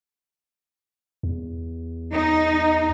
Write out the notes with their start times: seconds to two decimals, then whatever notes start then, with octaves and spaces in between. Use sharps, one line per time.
1.23 E2
2.13 D#4